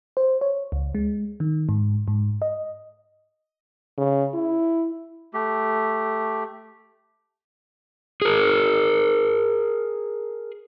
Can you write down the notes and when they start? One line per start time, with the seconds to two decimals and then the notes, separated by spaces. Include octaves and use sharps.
0.17 C5
0.41 C#5
0.72 C#2
0.95 G#3
1.40 D#3
1.69 G#2
2.08 G#2
2.42 D#5
3.98 C#3
4.34 E4
5.34 A3 G4
8.22 G#4 A#4